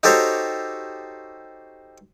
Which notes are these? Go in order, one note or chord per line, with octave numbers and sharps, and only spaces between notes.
D#4 F#4 G4 A4 C5 C#5